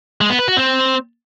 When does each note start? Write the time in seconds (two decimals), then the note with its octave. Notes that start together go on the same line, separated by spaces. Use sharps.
0.21 G#3
0.30 B3
0.39 B4
0.48 F#4
0.57 C4